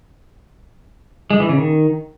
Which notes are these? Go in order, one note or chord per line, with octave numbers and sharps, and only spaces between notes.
G#3
E3
C#3
D#3